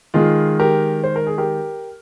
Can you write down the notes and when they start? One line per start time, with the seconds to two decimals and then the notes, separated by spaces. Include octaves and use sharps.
0.14 D#3 G#3 F4 G#4
0.60 G4 A#4
1.04 C5
1.16 A#4
1.27 G#4
1.38 G4 A#4